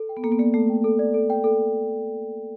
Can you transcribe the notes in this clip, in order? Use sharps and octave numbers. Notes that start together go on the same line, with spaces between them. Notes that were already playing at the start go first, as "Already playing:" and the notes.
Already playing: A4
G5
B3
A#3 A4
B3
A#3 D5
A3 A4
G5
A4
D5
A4
G5
A4